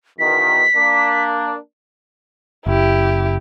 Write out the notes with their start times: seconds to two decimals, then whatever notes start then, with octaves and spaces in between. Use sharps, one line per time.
0.19 E2 B2 D#3 B6
0.76 A#3 D4
2.66 F#1 E4 G4